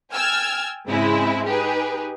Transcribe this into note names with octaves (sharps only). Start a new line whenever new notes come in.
G5 G#5 E6 F6 G#6 A6
G#2 C#3 G#3 C4 E4
D#4 G4 G#4 B4